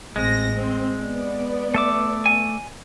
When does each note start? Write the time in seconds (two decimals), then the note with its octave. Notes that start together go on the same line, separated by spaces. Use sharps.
0.16 A1 G#3 C4 A#6
0.54 C4
0.98 B3 D5
1.74 A3 E5 D6
2.26 G#5